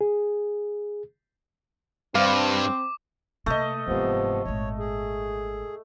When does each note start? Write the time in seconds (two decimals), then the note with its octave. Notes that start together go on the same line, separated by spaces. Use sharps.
0.01 G#4
2.15 G2 C4 F5 D6
3.46 C3 A3 A#3 D#5
3.87 F#1 G#2 C3 F3 B3
4.45 G#1 A#2 C#5
4.79 G#4